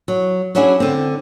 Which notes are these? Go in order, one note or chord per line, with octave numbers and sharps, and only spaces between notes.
F#3
F#3 C#4 D4 E4 F#4 G#4
D3 C4